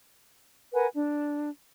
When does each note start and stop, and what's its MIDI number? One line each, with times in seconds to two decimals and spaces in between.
0.73 0.87 70
0.73 0.87 71
0.73 0.87 78
0.73 0.87 80
0.94 1.49 62